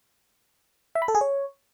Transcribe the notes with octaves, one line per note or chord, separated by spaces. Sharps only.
E5
B5
A4
G#4
C#5